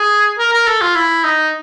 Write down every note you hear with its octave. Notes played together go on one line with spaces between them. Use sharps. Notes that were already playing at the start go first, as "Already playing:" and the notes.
Already playing: G#4
A#4
A#4
A4
F4
E4
D#4